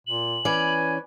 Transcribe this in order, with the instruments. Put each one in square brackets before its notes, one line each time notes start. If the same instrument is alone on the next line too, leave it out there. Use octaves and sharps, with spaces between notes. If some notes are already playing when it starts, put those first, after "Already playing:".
[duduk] A#2 [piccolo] F#7
[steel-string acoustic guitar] E3 C#4 D5 [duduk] B4 [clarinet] G#5